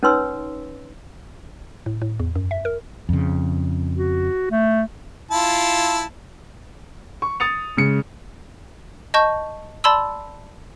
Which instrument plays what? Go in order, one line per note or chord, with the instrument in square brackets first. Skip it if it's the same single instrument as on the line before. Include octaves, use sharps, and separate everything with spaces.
[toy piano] C#4 D#4 B4 C#5 C6 E6
[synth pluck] A2
A2
E2
F#2
E5
A#4
[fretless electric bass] F2 C#3
[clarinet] F#4
A3
[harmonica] E4 F4 A5
[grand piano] C#6
D#6 A6 C#7 F7
C#3 G#3 C#7
[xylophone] D#5 A5 C#6 G6
D5 A5 B5 C6 E6